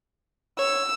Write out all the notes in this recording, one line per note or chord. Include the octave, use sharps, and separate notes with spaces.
C#5 E6